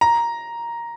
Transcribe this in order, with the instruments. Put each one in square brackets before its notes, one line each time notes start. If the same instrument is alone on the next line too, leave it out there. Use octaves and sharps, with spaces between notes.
[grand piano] A#5